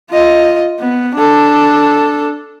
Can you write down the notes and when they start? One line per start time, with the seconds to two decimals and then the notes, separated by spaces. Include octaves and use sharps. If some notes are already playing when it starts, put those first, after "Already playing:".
0.11 F4 D#5
0.80 B3
1.15 D4 A4